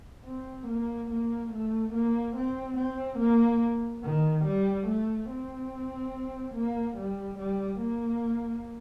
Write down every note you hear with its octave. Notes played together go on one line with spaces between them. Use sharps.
C4
A#3
A#3
A3
A#3
C4
C4
A#3
D#3
G3
A3
C4
A#3
G3
G3
A#3